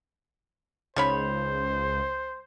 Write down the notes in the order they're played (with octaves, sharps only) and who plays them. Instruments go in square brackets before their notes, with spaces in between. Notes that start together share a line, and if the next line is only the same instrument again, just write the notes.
[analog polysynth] C#2 [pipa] D#3 C#5 B5 [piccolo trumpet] C5